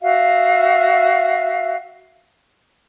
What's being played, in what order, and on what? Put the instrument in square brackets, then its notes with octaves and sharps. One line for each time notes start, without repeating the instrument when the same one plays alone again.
[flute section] F#4 E5 F5